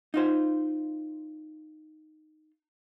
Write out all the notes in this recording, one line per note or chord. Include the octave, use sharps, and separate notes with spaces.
D#4 F4 C5